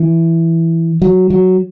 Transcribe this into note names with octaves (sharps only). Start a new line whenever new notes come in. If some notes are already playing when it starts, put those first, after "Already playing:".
Already playing: E3
F#3
F#3